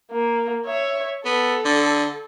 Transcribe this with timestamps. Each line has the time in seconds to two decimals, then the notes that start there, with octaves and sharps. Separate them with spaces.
0.12 A#3
0.66 C#5 E5
1.25 B3 A4
1.65 D3